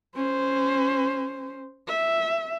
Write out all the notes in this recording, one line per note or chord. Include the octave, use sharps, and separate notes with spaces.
C#4 C5
E5